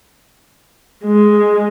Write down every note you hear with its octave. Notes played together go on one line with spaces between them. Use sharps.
G#3